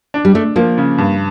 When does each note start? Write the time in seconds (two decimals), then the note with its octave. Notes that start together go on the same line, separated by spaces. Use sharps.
0.14 D4
0.25 G3
0.35 A3 D4
0.56 F3 A#3
0.78 C#3
0.98 G2